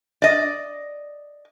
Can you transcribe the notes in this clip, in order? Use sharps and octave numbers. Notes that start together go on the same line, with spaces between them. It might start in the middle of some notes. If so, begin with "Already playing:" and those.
D5 D#5